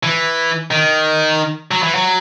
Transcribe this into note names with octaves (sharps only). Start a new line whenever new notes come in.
E3
D#3
F#3
E3
F#3